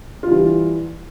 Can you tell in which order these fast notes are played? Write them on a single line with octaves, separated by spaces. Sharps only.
F4 G3 E3